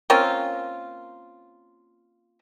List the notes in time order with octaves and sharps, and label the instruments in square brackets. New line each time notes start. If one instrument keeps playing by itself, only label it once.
[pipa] A#3 C4 C#4 F4